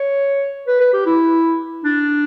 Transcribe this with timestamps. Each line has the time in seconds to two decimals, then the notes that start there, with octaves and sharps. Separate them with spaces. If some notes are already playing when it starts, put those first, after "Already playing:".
Already playing: C#5
0.67 B4
0.80 B4
0.93 G4
1.06 E4
1.84 D4